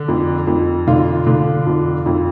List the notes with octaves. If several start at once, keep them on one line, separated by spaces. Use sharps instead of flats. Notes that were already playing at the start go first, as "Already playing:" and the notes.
Already playing: D3
F2
F2
D3 F4
D3
F2
F2